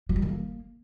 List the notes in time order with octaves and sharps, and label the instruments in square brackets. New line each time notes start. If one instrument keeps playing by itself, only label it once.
[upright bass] F#3
G3
D#3
A#3